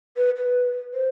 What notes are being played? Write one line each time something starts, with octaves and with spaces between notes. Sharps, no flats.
B4
B4
C5